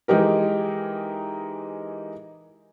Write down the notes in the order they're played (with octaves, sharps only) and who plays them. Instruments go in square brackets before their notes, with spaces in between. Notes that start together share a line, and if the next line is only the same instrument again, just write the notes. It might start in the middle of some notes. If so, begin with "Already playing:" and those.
[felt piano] E3 G#3 D#4 G4 A#4